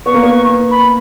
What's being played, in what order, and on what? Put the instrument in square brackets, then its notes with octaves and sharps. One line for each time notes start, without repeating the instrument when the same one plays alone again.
[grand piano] B3 [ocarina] C#6
[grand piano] A#3
B3
[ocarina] B5